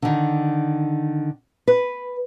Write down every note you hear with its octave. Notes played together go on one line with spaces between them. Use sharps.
D3 D#3
B4